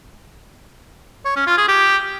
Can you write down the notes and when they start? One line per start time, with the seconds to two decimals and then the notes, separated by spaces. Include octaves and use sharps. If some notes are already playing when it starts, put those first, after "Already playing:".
1.26 C#5
1.36 C#4
1.47 F4
1.58 G#4
1.68 G4